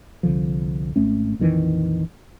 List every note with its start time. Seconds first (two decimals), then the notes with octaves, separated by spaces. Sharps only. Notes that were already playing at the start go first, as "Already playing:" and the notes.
0.23 C2 D3 F3
0.96 G#1 A3 C#4
1.39 A#1 F2 D#3 E3